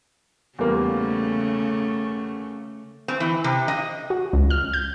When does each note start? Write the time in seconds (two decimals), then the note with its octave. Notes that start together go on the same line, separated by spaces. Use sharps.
0.59 E2 C#3 G3 A3 A#3
3.08 C4
3.20 E3
3.44 C3
3.68 D#5
4.10 F#4
4.33 C#2
4.50 F6
4.73 G6